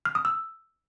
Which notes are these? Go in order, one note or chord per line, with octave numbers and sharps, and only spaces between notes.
F6
D#6
E6